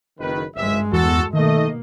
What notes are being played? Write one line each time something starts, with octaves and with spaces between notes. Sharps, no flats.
F#1 D#3 B4
G#1 C#2 G2 G#3 E5
E2 F#4 A4
B2 D#3 A3 A#3 D#5